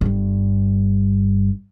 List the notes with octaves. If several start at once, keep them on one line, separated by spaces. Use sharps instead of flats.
G1 G2